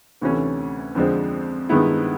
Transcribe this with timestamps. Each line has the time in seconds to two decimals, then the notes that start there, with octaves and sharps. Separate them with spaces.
0.21 D2 C3 E3 A3 C#4
0.95 F2 D3 F3 G#3 C4
1.69 G2 D#3 G#3 B3 E4